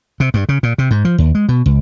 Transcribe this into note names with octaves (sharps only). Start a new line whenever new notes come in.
C3
G2
C#3
A#2
C3
G#2
F3
D#2
G#3
B2
C#2